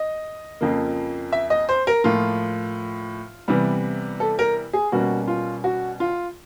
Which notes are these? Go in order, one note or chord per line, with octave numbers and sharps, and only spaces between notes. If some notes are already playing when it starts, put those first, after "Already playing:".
Already playing: D#5
F2 C#3 F3 A#3
E5
D#5
C5
A#4
A2 F3 A#3 F4
C3 E3 G3 B3
A4
A#4
G#4
B2 G3 A#3 C#4 F#4
F4
F#4
F4